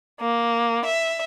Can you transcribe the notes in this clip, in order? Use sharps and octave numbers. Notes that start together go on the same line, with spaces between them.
A#3
E5